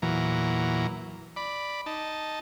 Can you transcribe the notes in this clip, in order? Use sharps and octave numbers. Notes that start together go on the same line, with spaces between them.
E2 A#2 E3 F#3 A#5
D5 B5
D#4 A5